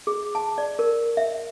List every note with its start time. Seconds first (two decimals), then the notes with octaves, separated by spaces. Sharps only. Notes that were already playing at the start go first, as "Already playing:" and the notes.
0.07 G#4
0.35 A5
0.58 D5
0.79 A#4
1.17 E5